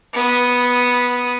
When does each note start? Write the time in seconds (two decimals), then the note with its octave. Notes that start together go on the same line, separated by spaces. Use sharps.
0.13 B3 D#6